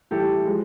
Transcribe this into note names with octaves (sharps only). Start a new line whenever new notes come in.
A2 E3 G3 G4 A4
F3 G#3